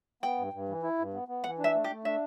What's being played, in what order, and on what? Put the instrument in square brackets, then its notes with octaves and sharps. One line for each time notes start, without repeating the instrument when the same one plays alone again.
[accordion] B3 [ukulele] G5
[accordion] G2
G2
E3
E4
G2
B3
B3
[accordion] E3 [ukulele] F#5
[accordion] D4
[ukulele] E5
[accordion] A3
[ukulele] G4
[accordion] A3
[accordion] D4 [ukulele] E5